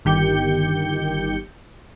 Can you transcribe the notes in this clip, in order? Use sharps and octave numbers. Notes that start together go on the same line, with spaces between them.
G1 D#3 G4 G6 C#7